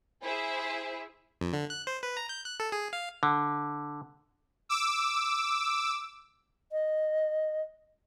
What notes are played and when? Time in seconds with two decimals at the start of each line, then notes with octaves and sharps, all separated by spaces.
0.22 E4 G#4 C5 E5
1.41 F2
1.53 D3
1.70 F#6
1.87 C5
2.03 B4
2.17 A#5
2.29 G6
2.45 F#6
2.60 A4
2.72 G#4
2.93 F5
3.23 D3
4.69 D6 E6
6.72 D#5